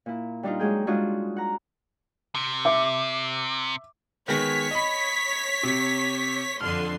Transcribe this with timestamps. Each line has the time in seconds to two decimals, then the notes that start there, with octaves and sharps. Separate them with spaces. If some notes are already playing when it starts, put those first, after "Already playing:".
0.06 A#2 E4
0.43 G3 D4 D#4 F4
0.59 F#3 G#3 G#4 G5
0.87 G3 G#3 D4 F4 F#4 G#4
1.37 F#5 A#5
2.35 C3
2.65 E5 D6
4.28 D#3 G#3 B3 C#5 B6
4.71 D#5 B5
5.63 C3
6.61 F2 D3 C6 F6